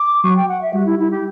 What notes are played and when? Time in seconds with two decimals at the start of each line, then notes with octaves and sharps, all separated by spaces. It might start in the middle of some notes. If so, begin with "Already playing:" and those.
Already playing: D6
0.23 F#3 C#6
0.36 G5
0.48 F#5
0.62 E5
0.74 G3 F#4
0.86 E4
0.99 E4
1.11 G4